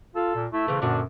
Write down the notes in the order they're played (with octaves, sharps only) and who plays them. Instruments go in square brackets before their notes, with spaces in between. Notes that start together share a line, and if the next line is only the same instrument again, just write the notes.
[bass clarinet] F4 [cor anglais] A4
[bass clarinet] A#2
[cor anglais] A3 [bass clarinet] E4
[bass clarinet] C#3 [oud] E3 C4
[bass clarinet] F#2 [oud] A#2 D3 F#4 [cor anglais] D4